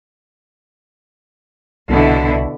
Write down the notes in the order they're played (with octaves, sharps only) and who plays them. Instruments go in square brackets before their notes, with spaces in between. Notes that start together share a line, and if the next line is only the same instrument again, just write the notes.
[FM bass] C2 [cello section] B2 D3 E4